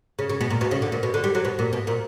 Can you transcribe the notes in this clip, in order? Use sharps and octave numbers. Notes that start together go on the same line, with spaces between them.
C#3
C#3
B2
A#2
B2
C#3
D3
A#2
B2
D3
G3
F#3
B2
A#2
B2
A#2